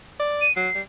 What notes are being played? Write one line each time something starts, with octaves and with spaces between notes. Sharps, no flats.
D5
D#7
F#3 C7
G3